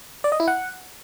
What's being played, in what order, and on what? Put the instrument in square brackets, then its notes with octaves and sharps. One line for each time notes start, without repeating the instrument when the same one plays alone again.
[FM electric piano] D5
D#5
E4
F#5